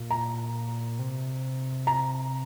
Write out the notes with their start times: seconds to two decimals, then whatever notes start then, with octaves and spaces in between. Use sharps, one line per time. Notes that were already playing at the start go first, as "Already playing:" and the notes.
Already playing: A#2
0.11 A#5
0.99 C3
1.87 A#5